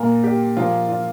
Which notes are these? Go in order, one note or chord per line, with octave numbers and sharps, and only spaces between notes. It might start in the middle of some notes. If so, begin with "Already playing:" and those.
Already playing: A#2 A#3 A#4
G4
A#2 F3 A#3 F4
F4